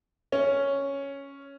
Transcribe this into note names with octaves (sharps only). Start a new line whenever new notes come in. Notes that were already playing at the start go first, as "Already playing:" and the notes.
C#4